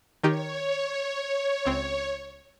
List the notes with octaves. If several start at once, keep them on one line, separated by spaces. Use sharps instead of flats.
D#3 D#4 G4 C#5
C#2 C4